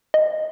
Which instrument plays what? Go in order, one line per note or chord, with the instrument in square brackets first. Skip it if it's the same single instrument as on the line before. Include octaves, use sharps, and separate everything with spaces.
[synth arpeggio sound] D#5